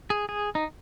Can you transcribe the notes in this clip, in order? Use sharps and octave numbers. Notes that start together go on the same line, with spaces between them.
G#4
G#4
D#4